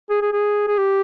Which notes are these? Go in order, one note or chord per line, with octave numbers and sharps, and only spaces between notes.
G#4
G#4
G#4
G#4
G4